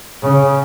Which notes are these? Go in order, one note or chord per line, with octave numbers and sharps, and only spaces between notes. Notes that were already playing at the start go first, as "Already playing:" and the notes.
C#3